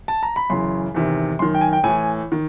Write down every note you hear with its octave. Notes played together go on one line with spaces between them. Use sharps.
A5
A#5
B5
F#2 C#3 E3 C6
E2 C3 D#3
F#2 D#3 C6
G5
G#5
G5
A2 E3 G#5
D#3